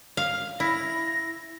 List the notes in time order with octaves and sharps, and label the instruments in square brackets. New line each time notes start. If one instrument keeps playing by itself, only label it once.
[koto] F5
[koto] E4 [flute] A#6